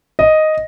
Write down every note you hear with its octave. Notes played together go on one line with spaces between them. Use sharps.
D#5